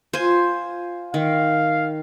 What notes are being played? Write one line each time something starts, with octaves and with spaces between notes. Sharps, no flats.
F4 C5 G#5
D#3 F5